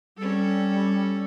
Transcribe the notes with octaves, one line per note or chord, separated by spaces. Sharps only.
G3 C#4 A4